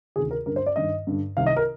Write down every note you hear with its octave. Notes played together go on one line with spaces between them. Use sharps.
D2 C3 D#3 G#4
A#4
G2 D3 A#4
C5
D5
G2 D#3 D#5
G2 D3
C2 C3 D#3 F5
D#5
A#4